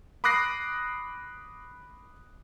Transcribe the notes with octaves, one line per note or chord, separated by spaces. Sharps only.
B5 D6 D#6 F#6 A#6 C7